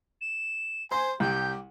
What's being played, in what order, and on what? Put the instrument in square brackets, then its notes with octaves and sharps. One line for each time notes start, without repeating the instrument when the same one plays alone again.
[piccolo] E7
[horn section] C5 G#5 [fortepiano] C6
[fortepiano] C2 [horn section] G4 [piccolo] G6